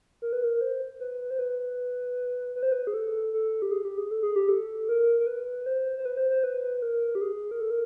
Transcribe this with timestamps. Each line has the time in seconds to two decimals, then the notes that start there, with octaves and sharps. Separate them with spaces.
0.22 A#4
0.33 B4
0.44 A#4
0.61 C5
1.00 B4
1.30 C5
1.39 B4
2.56 B4
2.63 C5
2.72 B4
2.87 G#4
2.94 A4
3.33 A4
3.62 G4
3.71 G#4
3.85 G4
3.98 G#4
4.11 A4
4.23 G#4
4.36 G4
4.49 A4
4.89 A#4
5.20 A#4
5.27 B4
5.66 C5
5.98 C5
6.05 B4
6.17 C5
6.30 C5
6.44 B4
6.82 A#4
7.15 G4
7.21 G#4
7.51 A#4
7.60 A4
7.70 A#4